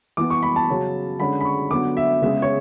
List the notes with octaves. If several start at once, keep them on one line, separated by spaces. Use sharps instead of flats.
E3 B3 D6
C#6
B5
A5
C#3 F#3 C#4
D3 G#3 C#4 B5
B5
C#6
D3 F#3 B3 D6
E5
C#3 G#3 B3 E5
C#5